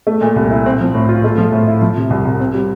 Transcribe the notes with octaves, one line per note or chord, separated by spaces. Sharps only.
A3
A#2
C2
E4
C4
F3
A2
F4
A3
F3
A2
E4
F3
C3
C2
C2
C4
G3